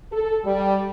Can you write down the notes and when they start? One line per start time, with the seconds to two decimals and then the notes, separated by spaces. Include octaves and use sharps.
0.12 A4
0.44 G3